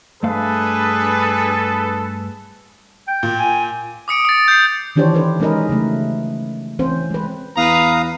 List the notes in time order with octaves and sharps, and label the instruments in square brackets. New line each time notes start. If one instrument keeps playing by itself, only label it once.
[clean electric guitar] G2 A3 F5 [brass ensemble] D4 G#4 B4 [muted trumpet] A4
[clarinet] G5
[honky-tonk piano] A#2
[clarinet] G#5
[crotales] D6 D#6 C#7 D7
D#6 A6
G6 C7
[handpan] D#3 E3 D4 G4 C5 C#5
D4 A4 B4 C5
G#3 C#4 D#4 A#4 B4 D#5
C#3 F#3 A3
E3 C4 C#4 C5
G#3 B4
[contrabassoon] E2 [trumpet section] B4 A#5 [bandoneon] F5 D#6